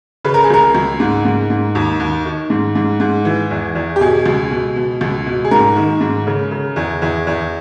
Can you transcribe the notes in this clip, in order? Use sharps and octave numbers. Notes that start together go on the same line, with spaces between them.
C#3 B4
A#4
G#4
C#2 A#4
C#2
G#2
G#2
G#2
D#2
D#2
D#3
G#2
G#2
G#2
E3
E2
E2
G4
B2 G#4
C#2
B2
B2
C#2
B2
G#4
G#2 A#4
D#3
G#2
C#3
C#3
E2
E2
E2